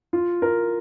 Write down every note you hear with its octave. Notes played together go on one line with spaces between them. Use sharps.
F4
A#4